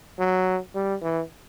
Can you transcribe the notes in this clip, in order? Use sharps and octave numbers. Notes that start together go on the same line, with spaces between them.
F#3
G3
E3